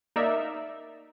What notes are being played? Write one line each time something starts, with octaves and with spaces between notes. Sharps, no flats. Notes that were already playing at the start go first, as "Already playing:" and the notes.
A#3 D#4 A#4 D5 E5